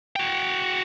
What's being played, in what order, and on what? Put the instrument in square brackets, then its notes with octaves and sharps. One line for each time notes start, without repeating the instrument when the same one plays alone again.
[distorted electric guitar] F#4 G5